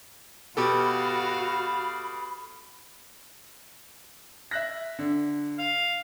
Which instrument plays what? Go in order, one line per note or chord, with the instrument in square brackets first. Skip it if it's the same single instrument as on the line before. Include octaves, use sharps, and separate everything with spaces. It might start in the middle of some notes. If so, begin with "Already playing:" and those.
[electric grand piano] B2 G4 A4 [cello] F#4 [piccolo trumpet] F5 [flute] B5
[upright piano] E5 F#6 A#6
D3
[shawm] F5